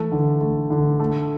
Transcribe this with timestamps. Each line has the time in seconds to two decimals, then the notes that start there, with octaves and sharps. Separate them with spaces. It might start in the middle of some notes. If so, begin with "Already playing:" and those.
Already playing: E3 A3
0.12 D3
0.41 A3
0.70 D3
0.99 A3